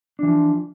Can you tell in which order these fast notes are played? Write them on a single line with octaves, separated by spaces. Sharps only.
D4 E3 F3